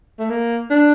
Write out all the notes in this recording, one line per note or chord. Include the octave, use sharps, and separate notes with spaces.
A3
A#3
D4